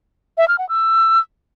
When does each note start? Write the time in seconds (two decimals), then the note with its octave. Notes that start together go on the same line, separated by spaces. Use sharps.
0.38 E5
0.48 F6
0.58 F#5
0.69 E6